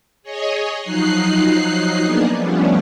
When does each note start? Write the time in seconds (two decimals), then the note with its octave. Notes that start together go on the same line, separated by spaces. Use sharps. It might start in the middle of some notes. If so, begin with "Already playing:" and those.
0.22 G#4 C#5 D#5
0.82 F3 F#3 D#4 F#6 C7
2.01 A#3 B3 D4 D#4 G#4
2.36 F3 G3 A3 B3 C#4 D4